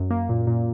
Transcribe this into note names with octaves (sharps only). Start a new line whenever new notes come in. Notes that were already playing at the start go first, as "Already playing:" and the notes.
Already playing: F#2
A#3
A#2
A#2